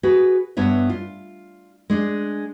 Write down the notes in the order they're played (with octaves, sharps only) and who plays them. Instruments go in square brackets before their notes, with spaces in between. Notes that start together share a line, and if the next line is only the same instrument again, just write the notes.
[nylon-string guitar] F#4 G#4 B4
G2 B3 C#5 E5
F4
G#3 D4